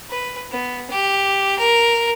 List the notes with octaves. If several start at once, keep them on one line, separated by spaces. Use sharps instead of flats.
B4
B3
G4
A#4